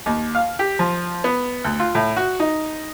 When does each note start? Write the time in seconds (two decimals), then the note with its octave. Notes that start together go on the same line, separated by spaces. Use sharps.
0.06 D#2
0.35 F5
0.59 G4
0.79 F3
1.24 B3
1.64 D2
1.80 F4
1.95 A2
2.16 F#4
2.40 D#4